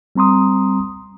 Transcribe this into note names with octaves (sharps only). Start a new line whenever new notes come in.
G3 C4 A#5 C6 D#6